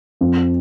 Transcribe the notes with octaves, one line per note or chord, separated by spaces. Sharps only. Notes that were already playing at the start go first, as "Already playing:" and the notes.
F2